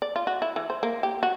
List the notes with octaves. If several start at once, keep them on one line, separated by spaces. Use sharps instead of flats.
D5
F4
F#4
E4
E3
C5
A#3
G4
F#4